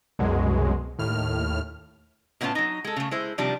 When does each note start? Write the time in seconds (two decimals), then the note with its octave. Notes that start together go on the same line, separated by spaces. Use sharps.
0.19 C2 F#2 B2 F#3 G#3
0.99 D#2 A2 F6
2.41 A2 C3 B3 C#4 F4 A5
2.55 F#3 D#4
2.84 G#3 A4
2.96 C#3 A3
3.11 G#3 E4 C5
3.38 C3 D#3 F3 G3 D4